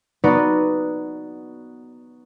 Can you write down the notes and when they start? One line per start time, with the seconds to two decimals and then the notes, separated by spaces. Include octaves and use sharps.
0.24 B3 D#4 F#4 B4 D5